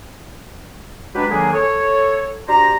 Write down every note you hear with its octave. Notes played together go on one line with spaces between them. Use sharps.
F#3 G#3 D4 G4 B4
D3 D#3 F#3 A#3 D4 G#4
A4 C#5
D4 F#4 G4 C5 A#5